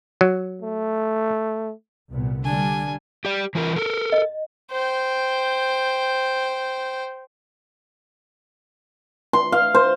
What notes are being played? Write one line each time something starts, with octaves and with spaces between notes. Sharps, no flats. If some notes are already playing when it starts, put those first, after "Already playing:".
F#3
A3
C2 A#2 B3
D3 G3 D4 G#5
G4 D5
E3 F4 A#4
A4 A#4
D#5
C5 G5
C6
F5
C5